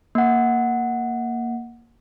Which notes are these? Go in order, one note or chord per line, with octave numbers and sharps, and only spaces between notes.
A#3 F#5